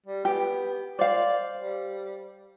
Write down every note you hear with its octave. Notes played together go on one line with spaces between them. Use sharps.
G3
B3 G4
C5 D5 F5
G3